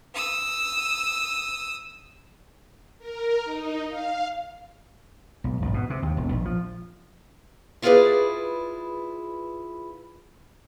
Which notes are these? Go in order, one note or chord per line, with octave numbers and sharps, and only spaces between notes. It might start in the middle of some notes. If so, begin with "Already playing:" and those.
D#6 E6
A#4
D#4
F5
B1
G#1
B2
C3
D#2
E1
A#1
F3
E4 F4 G#4 A#4 B4 D5